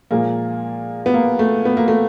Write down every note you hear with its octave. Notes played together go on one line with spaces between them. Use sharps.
A#2 F3 G#3 A#3
B3
A#3
A3
B3
A#3
A3